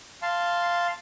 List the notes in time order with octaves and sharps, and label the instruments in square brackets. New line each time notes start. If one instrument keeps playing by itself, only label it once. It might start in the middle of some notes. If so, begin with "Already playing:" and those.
[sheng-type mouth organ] F5 A5 C6